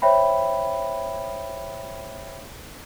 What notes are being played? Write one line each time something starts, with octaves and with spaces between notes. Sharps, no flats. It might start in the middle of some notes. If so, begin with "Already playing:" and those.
C5 C#5 E5 G5 B5